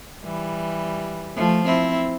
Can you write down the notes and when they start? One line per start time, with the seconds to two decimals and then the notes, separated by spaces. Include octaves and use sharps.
0.23 E3 G3
1.36 F3 A3
1.65 C4 E4